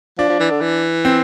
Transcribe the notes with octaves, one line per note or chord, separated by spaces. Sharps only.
F3 D4
F3
E3
D3
E3
C4